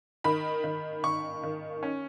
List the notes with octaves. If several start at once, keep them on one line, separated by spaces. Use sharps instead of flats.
D#3 B5
D#3
D#3 C#6
D#3
C#4